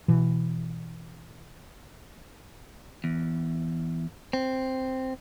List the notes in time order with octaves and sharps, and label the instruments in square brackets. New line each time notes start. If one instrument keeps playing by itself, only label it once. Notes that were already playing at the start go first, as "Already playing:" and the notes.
[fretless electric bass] B2 E3
[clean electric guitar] E2
C4